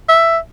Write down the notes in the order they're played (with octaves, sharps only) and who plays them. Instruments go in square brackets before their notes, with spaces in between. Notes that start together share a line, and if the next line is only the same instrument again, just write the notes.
[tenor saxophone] E5